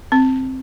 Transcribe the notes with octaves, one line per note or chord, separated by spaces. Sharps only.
C4